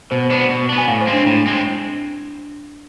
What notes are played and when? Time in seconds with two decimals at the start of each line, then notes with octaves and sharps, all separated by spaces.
0.11 B2 C5
0.30 B3 D4 C5
0.49 B2
0.69 B3 D4
0.78 G#5
0.88 A2 F5
1.01 C5
1.07 G#3 C4
1.13 D4
1.26 A2 E4
1.46 G#3 C4